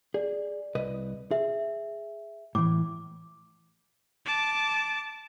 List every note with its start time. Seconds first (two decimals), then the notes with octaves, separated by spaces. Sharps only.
0.14 G#4 D5
0.75 C2 B4 D#5
1.31 G#4 E5
2.55 A2 E3 D6
4.26 A5 D6